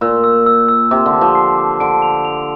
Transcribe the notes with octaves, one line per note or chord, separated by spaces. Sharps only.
A#2 E6
E6
E6
E6
C3 D6
D3
D6
F3
C7
D6
D3 D7
F7
F7